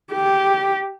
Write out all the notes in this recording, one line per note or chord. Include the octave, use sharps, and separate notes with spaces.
G4